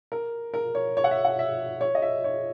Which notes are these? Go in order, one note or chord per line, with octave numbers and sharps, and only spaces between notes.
A#4
A#4
C#5
C#5
F#5
E5
F#5
E5
C#5
D#5
E5
C#5